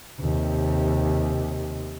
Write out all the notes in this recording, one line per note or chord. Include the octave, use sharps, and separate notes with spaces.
D#2 C3